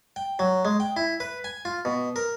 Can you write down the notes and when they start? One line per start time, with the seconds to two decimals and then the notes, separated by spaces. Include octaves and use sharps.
0.16 G5
0.39 F#3
0.65 G#3
0.80 G5
0.96 E4
1.20 B4
1.44 G#5
1.65 F4
1.85 B2
2.16 A#4